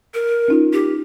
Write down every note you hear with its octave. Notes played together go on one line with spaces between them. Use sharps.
A#4
C#4 D#4 F4
G4